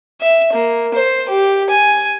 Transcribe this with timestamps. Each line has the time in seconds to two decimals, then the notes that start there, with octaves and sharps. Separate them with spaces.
0.21 E5
0.53 A#3
0.94 C5
1.29 G4
1.70 G#5